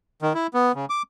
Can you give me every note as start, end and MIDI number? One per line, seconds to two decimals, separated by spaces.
0.22 0.33 51
0.34 0.47 64
0.54 0.72 59
0.75 0.85 49
0.90 1.02 86